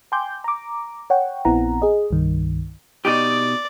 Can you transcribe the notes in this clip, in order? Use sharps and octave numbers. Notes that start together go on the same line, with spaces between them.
G5 G#5 C6 D6 G6
A#5 D6
C#5 F#5 G5
A#1 B3 C4 E4 F#5 A#5
G#4 D#5
C2 G2 D#3
B2 D#4 G4 D5